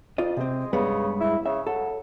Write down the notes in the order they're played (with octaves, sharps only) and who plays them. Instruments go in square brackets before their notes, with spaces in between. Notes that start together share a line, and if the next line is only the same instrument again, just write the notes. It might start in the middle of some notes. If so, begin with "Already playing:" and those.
[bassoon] F2 [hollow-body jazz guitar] F4 D5 D#5
[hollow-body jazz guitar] C3 C4 [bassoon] G#3
[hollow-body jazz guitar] G2 G#3 B3 [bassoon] C#3
[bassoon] E4
[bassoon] C#3 [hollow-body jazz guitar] E5
[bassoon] F#3 [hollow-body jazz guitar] A4